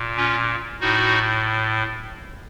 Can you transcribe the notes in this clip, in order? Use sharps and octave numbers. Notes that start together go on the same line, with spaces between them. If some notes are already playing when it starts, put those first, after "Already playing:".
Already playing: A#2
C#4 F4
A2 D#4 F#4